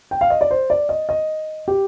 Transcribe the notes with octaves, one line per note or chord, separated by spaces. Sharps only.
G5
F5
D#5
D5
C5
D5
D#5
D#5
G4